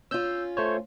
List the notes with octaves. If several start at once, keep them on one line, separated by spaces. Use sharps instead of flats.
C#4 F4 E6 G6
A3 C5 C#5